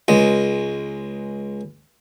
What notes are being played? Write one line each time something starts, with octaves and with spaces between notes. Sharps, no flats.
C#2 G#3